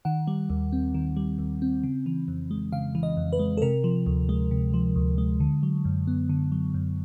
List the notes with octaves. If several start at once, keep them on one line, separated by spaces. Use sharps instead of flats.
D#3 F#5
G3
D#2
C4
D#3
G3
D#2
C4
C#3
E3
F2
G#3
C#3 F5
E3
D#5
F2
B4
G#3
A4
C3 A#4
F3
D2
G#3
C3
F3
D2
G#3
D3
F#3
F#2
B3
D3
F#3
F#2